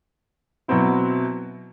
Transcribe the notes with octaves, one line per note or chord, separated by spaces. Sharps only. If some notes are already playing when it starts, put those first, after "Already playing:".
B2 F#3 C4 E4